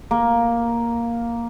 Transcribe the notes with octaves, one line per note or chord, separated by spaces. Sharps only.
A#3